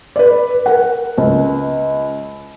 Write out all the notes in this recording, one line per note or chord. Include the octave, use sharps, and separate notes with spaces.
B4 D5
A#4 F#5
C#2